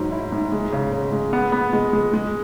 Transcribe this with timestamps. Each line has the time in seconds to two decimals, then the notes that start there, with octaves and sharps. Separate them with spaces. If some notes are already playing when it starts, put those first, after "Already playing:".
Already playing: G#2 F#3
0.12 E4
0.32 G#2
0.52 G#3
0.72 C#3
0.93 C#3
1.12 G#3
1.33 B3
1.52 B3
1.73 G#3
1.93 G#3
2.14 G#3